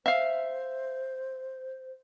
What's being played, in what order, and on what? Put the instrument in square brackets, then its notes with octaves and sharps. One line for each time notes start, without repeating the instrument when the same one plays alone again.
[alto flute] C5 [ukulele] E5 F5